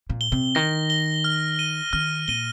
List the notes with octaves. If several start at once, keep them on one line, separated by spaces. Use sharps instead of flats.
A#2
G7
C3
D#3 A#6
G7
F6
D#7 G7
D#3 F6
A#2 D#7 G7